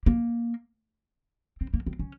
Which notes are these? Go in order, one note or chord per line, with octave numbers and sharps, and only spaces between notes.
A#3
C4
A#3
C4
C#4